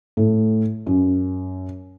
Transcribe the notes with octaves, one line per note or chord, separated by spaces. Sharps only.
A2
F#2